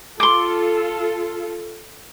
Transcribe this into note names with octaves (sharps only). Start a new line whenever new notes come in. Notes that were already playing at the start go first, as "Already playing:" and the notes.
F4 A4 C6 D6